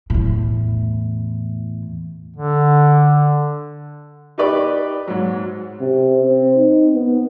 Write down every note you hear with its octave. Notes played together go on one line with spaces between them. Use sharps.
E2 A2
D3
D#4 G4 B4 D5
G#2 F#3
C3
C4
D#4
B3